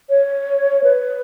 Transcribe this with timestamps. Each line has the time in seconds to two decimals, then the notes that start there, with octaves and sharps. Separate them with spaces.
0.10 C#5
0.84 B4